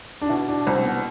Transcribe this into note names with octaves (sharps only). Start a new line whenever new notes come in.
D4
B2 E4
D4
C2 C4
B3